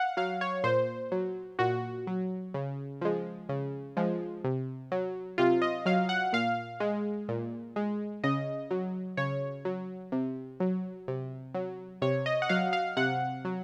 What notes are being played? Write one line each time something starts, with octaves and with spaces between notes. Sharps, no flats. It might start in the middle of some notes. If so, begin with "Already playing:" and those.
Already playing: F5 F#5
F#3 F5
C#5
A#2 C5
F#3
A#2 F#4
F#3
C#3
F3 G#3
C#3
F3 G#3
C3
F#3
C3 F4
D#5
F#3 F5
F#5
A#2 F5
G#3
A#2
G#3
C#3 D#5
F#3
C#3 C#5
F#3
C3
F#3
C3
F#3
C3 C#5
D#5
F#5
F#3 F5
F5
C3 F#5
F#3